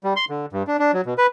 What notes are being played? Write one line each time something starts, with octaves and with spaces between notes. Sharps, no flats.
G3
C6
D3
G2
D4
D4
F#3
B2
B4